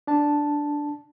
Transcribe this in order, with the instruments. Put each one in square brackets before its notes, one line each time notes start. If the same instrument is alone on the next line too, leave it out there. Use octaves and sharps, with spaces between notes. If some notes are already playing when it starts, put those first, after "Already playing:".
[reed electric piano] D4 A5